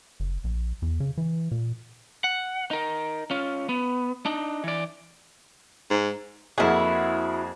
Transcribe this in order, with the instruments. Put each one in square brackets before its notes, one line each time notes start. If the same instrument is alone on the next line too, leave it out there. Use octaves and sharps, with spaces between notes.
[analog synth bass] F#1
A#1
E2
C#3
E3
A#2
[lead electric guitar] F#5
D#4 A#4
C#4 F4
B3
D4 D#4
E3 D5
[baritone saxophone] G#2
[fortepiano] F2 A#3 G#4 [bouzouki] E4 F#4